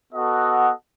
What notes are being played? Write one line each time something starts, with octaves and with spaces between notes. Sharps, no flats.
B3 F#4 A4 D#5 F#5